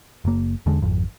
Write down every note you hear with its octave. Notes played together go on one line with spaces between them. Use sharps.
F#1 A#3
E2 D3 G#3
G#1 F2